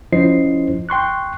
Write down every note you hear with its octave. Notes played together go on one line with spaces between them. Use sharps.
F3 C#4 E4 C5 D#5 C7
G5 C6 C#6 F#6